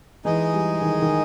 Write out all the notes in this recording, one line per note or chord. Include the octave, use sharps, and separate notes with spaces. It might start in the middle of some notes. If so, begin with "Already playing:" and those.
E3 G#3 D#4 G#4 D#5
G3
D#3
D#3